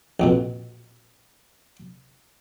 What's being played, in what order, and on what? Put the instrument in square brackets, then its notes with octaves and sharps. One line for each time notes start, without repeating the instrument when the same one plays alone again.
[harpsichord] A#1 F2 B2